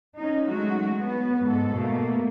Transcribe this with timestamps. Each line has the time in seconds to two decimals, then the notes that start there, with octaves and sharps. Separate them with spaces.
0.16 C#4 D#4
0.49 F#3 G#3 A3 F#4
1.01 B3
1.44 G#2 A4
1.74 B2 A3 A#3